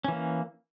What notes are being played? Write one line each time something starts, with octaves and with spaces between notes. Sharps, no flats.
E3 A#3 C#4